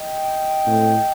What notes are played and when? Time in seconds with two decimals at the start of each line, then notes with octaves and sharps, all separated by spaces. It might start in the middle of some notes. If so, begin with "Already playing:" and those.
Already playing: D#5 G5
0.67 A2 A3 C4